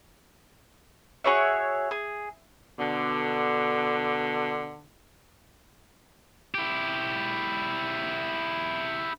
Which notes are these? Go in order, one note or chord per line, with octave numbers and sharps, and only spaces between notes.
F#4 G#4 C#5 E5
G#4
B2 D3
E4 G4